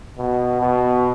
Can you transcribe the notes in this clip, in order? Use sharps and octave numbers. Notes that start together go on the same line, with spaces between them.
B2
B2